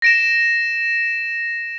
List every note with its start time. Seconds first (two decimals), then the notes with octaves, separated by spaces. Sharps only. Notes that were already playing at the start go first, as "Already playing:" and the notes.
0.02 A#6 D7 E7